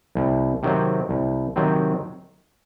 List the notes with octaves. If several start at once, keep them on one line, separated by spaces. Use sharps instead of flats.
C2
C3 D#3 F#3 C4
C2
C3 D#3 F#3 C4